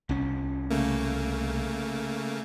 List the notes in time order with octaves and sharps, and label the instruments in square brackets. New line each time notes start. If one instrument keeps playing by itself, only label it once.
[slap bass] C2 C#4
[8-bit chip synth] C#3 A3 A#3